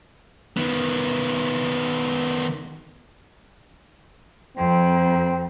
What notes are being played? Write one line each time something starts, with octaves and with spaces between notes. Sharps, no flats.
D#3 B3
F2 C4